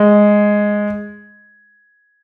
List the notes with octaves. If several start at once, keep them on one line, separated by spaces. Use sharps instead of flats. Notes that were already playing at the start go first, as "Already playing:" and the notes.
Already playing: G#3